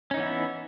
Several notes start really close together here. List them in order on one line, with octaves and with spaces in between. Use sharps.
C#4 D#4 E3 B3 E4